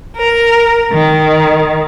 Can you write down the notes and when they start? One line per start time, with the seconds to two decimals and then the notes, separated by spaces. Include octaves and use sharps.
0.17 A#4
0.92 D#3